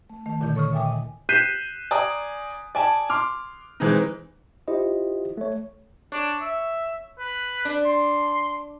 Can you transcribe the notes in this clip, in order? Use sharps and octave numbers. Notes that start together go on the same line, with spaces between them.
A3
D#3 A3
D2 A#2 D3 D#3 E4 G6
A4 C#5 C#6 D#6 F6
A#2 E5 G5 G#5 D6 D#6
D#5 G#5
F#6 G6 B6 C7 D#7 E7
D5 G#5 A#5 D#6
D5 G#5 A5
C6 D6 F6
E3 G#3 C4 D#4
E4 F4 G4 C5 D#5
A3 C#5
D4 C#5
E5
B4
D4
C6